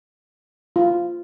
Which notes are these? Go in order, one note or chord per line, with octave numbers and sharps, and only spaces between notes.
F4